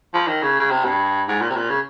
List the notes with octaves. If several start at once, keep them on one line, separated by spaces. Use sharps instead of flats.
F3
D#3
C#3
C#3
C3
G2
G#2
A#2
C3
A#2
C#3